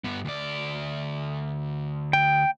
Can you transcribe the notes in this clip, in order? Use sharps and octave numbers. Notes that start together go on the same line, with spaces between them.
G2 B3
D2 D5
G5